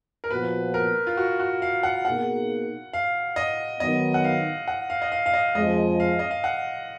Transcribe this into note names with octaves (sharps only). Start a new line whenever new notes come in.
A#4
A#2 F3 B3 F#4 B4
A#4
F4
F#4
F#4
F5
F#5
B2 A#3 D#4 G#4 F#5
F5
D#5
D#3 F#3 B3 D#5
F#5
F5
F#5
F5
D#5
F5
F5
D#5
F2 F3 G#3 D#5
F5
D#5
F5
F#5